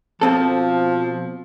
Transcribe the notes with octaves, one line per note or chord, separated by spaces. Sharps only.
B2 F3 C4 A4